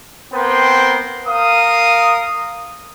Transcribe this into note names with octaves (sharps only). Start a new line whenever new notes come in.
B3 C4 A#4 G5 C6
A#4 F5 D#6